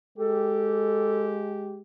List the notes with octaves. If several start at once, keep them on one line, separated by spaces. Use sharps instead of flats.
G#3 G4 A4